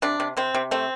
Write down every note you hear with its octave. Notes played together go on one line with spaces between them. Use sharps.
C3 D4
C3
C3 C4
C3
A3 C4